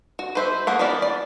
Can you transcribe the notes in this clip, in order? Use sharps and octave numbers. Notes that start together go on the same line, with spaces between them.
F#4
B4 C5 E5
A#3 B3 F#5
E3 B3 A#4 D5 B5
D5